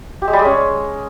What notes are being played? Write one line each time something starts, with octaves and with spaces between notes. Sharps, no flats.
G4
G#3
G3
G#3
C#4